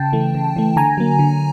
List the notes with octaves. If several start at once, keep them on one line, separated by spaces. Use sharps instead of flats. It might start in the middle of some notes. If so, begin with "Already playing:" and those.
Already playing: C#3 G5 A5
E3 A3
C#3
E3 A3
D3 G#5 A#5
F#3 A#3
D3